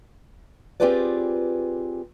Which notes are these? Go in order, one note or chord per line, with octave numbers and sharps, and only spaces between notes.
C4 F4 G4 G#4 B4 D5